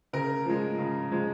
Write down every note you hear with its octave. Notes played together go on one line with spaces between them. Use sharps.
C#3 A#4
F3 G#3
C#3
F3 G#3